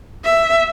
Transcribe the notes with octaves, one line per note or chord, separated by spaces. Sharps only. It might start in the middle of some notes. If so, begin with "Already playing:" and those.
E5